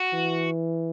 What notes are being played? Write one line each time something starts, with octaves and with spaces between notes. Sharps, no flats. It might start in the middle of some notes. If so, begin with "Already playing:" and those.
Already playing: F#4
E3